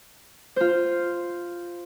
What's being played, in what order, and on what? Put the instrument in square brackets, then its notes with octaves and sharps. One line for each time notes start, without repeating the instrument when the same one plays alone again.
[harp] F4 C5